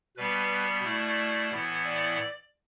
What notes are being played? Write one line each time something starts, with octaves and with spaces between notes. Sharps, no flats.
B2 G3 B3 B4
B2 A3 E4 D5
A2 E3 B3 E4
D5